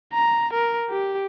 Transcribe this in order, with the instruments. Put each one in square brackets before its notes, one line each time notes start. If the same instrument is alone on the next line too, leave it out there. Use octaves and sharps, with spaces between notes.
[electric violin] A#5
A#4
G4